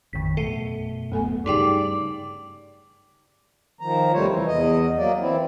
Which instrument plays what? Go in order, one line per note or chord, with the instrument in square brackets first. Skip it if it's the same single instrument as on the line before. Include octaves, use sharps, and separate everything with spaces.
[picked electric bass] A1 F2 [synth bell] D#3 B6
[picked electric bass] F#2 B2 A3 [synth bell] A4 C7 D#7
[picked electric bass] D1 F#2 B3 [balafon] A3 A4 G#5
[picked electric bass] G2 C#3 [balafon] D#4 [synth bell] G4 G#4 G5 [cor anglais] D5
[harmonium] D#3 F3 A#5
D#2 C3 G3 A3 C5 C#5
E3
E2 D#5
F#3 A#3 D5
E3 C4 E4